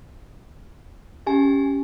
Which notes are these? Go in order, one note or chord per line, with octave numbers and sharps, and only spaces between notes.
C#4 G4 G#5